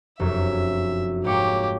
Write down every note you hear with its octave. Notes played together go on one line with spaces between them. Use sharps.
F1 F#2 E5
G#2 A#3 G4 C#5